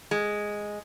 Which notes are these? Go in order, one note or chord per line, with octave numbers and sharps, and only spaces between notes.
G#3